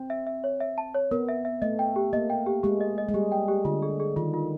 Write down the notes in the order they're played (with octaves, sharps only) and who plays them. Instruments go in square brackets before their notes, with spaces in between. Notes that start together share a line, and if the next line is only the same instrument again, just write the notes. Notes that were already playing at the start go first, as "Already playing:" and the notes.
Already playing: [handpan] C4
[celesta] E5
E5
C#5
E5
A5
C#5
[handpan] B3 [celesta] A#4
[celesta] E5
E5
[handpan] A3 [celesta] D#5
[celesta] G5
G4
[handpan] A#3 [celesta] D#5
[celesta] G5
G4
[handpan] G#3 [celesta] G4
[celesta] D#5
D#5
[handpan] G#3
[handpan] G3 [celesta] G4
[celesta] G5
G4
[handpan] D3 [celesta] F4
[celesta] G#4
G#4
[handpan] D#3 [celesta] F4
[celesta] F4